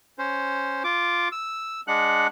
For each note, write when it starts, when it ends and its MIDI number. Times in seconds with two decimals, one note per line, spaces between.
0.18 0.83 61
0.18 0.83 72
0.84 1.28 65
0.84 1.28 86
1.32 1.81 88
1.88 2.27 56
1.88 2.27 62
1.88 2.27 78
1.88 2.27 90